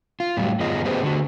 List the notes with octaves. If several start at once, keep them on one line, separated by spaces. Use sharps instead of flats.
F4
A2 F#3 G3
F#2 B3 F4 G#4 D#5
B3 G4 G#4 B4 C5
D3 F#4